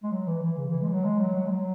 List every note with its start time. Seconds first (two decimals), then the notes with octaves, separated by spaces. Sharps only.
0.03 G#3
0.11 F#3
0.27 E3
0.42 E3
0.58 C#3
0.69 E3
0.82 G#3
0.88 E3
0.92 F#3
1.04 G#3
1.20 F#3
1.35 F#3
1.47 G#3
1.50 F#3